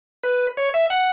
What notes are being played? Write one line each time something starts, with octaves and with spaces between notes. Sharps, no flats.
B4
C#5
E5
F#5